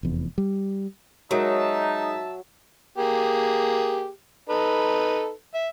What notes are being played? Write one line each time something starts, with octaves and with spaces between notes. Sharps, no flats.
F1 E2
G3
F#3 G#3 D#4 F#4 A#4 E5 A5
A#3 G4 G#4
D#4 A4 B4
E5